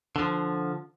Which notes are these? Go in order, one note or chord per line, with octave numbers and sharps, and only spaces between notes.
D3 F3